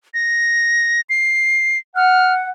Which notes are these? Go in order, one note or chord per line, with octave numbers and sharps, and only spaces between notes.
A#6
C7
F#5 F6